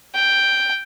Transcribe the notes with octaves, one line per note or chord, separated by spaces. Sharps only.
G5